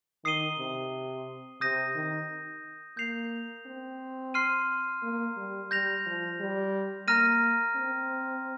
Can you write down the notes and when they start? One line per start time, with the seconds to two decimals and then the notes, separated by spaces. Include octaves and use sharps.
0.24 D#3 D#6 C7 D#7 G7
0.58 C3
1.61 C3 D#6 G6 A#6 D#7
1.95 D#3
2.97 A#3 G6 C7 F7
3.66 C4
4.34 C6 F6 C7 D#7
5.03 A#3
5.37 G3
5.71 G3 G6 A#6 F7
6.06 F3
6.40 G3
7.07 A#3 A#5 F6 A#6 D#7
7.76 C4